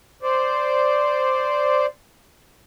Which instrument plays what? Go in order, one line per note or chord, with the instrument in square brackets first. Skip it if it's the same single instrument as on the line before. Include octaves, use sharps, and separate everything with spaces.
[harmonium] C5 D5